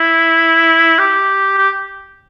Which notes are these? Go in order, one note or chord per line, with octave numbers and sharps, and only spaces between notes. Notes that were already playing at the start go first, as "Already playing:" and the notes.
Already playing: E4
G4
G4